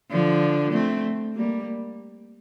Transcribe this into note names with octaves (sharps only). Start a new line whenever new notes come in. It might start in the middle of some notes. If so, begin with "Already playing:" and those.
D3 F3
A3 C4
G3 A#3